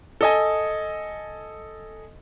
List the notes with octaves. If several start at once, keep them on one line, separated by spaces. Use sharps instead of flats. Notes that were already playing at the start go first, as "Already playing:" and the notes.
A4 D#5 G#5